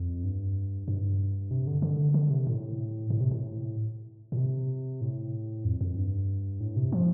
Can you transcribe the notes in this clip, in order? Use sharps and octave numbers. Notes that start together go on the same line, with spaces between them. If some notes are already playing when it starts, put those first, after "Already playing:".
Already playing: F2
G2
G2
C3
D3
D3
D3
C3
A2
A2
C3
A2
A2
C3
A2
F2
F2
G2
A2
C3
F3